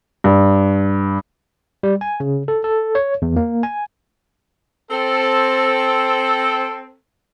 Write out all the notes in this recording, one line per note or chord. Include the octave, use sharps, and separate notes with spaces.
G2
G3
G#5
C#3
A4
A4
C#5
E2
A#3
G#5
C4 A4